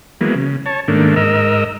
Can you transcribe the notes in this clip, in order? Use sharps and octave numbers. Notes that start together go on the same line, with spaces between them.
E3 F#3 G#3 A#3 B3
C#3
C#5 A5
G#2 D#3 A3 A#3 D4
G#2 A#4 D#5 E6